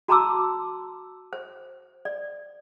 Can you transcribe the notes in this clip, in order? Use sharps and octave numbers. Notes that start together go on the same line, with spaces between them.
F#4 A5 A#5 C6 D6 E6
C5
D5